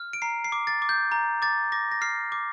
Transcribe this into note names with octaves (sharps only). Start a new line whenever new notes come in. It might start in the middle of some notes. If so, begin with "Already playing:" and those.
Already playing: F6
D7
A#5 C7
C7
D6
A6
D6
G6
A#5
D6 A6
D6 A#6
A#6
F6 C7
D6